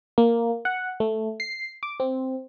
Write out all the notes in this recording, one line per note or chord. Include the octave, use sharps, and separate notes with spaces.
A#3
F#5
A3
C7
D6
C4